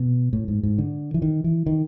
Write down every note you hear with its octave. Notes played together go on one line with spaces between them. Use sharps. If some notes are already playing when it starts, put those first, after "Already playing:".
Already playing: B2
A2
G#2
G#2
D3
E3
D#3
E3
D#3